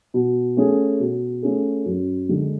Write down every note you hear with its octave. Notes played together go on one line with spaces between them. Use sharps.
B2
A3 C#4 G#4
B2
A3 C#4 G#4
F#2
D3 G#3